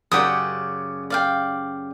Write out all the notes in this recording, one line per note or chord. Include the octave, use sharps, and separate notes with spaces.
F#2 C#3 G4 D5 F#5 D#6
D5 F5 G5